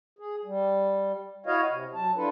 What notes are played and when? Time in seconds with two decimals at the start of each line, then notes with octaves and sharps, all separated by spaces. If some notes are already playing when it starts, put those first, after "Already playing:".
0.19 G#4
0.45 G3
1.46 E4 F#4 C#5 D#5 F5
1.69 C3
1.94 F#3 A5
2.16 D4 E4 F4 A4 B4